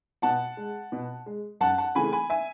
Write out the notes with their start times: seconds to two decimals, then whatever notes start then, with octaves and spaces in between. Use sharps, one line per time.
0.22 B2 F#5 A5
0.57 G#3
0.92 B2
1.26 G#3
1.60 F#2 F#5 A5
1.78 F#5 A5
1.95 C#3 E3 A3 G#5 B5
2.12 G#5 B5
2.30 E5 G#5